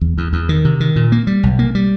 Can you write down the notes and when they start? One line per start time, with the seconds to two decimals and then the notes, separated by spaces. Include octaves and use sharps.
0.01 E2
0.18 E2
0.33 E2
0.49 D#3
0.65 C3
0.80 D#3
0.96 A#2
1.12 A#3
1.27 G3
1.43 B1
1.59 A#3
1.75 G3